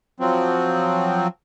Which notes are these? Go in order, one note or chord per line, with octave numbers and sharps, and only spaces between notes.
F3 F#3 C4